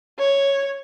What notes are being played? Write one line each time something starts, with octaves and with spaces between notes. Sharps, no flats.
C#5